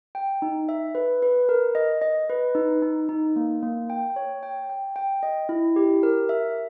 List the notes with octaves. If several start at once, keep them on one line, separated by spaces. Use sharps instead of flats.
G5
D#4
E5
B4
B4
A#4
D#5
D#5
B4
D#4
D#4
D#4
A#3
A#3
G5
C#5
G5
G5
G5
D#5
E4
G4
A#4
E5